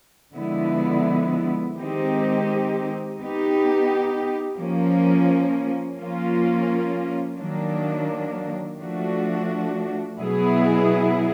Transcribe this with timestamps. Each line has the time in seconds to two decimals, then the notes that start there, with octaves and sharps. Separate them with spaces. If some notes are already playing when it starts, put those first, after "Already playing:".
0.34 D3 F3 G#3 B3 E4
1.75 D#3 G#3 C4 D#4 G4
3.17 B3 D#4 G4
4.57 F3 A#3 C#4
5.98 F3 A#3 C#4 F4
7.38 D#3 F#3 A#3 D4
8.79 F3 A3 D4 F#4
10.19 B2 F#3 B3 E4 G#4